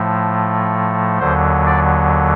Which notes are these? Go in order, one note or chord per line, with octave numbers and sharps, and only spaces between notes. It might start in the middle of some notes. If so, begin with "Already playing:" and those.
Already playing: A2 F3 A3
D#2 D3 F#3 C5
D5